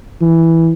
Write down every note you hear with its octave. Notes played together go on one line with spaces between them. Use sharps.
E3